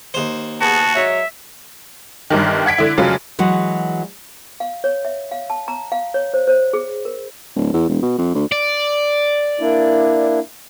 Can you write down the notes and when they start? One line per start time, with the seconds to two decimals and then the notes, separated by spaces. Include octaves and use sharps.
0.14 D#2 C5
0.61 B3 F#4 G#4 A5
0.95 F#3 G#3 C#5 E5
2.30 G1 G2 D#3
2.66 F#5 G#6 B6 D7
2.78 D3 E4
2.98 F1 C#3 F#3 F4
3.39 E3 F#3 G#3 F#4
4.60 F5
4.84 C#5
5.05 E5
5.31 F5
5.50 A5
5.68 A#5
5.92 F5
6.14 C#5
6.34 C5
6.47 C5
6.73 G#4
7.05 A#4
7.56 D1
7.74 E2
7.89 E1
8.02 B2
8.18 F2
8.35 D2
8.52 D5
9.60 A#3 D4 E4